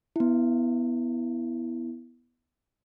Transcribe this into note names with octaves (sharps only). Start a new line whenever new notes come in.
B3 E4